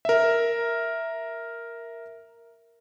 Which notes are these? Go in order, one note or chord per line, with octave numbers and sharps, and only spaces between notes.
A#4 E5